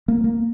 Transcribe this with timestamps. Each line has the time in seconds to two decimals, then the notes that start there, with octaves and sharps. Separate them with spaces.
0.08 A#3
0.24 A#3